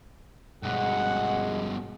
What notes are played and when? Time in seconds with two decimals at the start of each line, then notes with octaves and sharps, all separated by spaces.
0.63 G2 B2 G#3 F#5